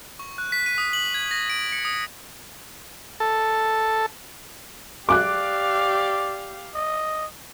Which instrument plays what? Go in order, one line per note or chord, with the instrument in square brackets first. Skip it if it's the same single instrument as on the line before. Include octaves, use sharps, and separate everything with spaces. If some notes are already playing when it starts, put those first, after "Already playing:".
[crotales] C#6
F#6
B6
D#7
D#6
F#7
G#6
A#6
D7
C#7
D#6
[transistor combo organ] A4
[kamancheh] G4 F5 [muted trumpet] D5 [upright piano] D6 F#6
[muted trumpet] D#5